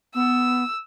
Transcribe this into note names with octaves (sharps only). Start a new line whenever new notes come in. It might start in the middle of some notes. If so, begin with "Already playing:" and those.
B3 E6